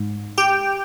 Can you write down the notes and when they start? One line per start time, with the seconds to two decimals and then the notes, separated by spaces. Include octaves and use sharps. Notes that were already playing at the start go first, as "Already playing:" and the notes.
Already playing: G#2
0.38 G4 G5